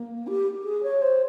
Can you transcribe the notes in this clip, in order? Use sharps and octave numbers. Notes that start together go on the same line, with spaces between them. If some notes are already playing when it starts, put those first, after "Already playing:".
Already playing: A#3
G4
G#4
C#5
C5